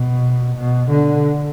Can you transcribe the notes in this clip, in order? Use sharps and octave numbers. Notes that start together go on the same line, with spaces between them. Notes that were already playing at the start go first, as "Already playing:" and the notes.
Already playing: B2
B2
D3